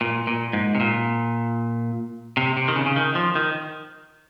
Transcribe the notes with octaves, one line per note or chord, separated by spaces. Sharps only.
A#2
A#2
G#2
C3
A#2
C3
C3
D#3
C#3
C#3
D#3
F3
D#3